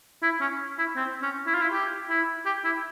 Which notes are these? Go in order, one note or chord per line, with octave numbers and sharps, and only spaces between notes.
E4
C#4
E4
C4
C#4
E4
F4
E4
G4
E4
G4
E4